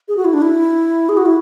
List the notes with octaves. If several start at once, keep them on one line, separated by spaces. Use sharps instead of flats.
G#4
F#4
E4
D4
E4
G#4
F#4
E4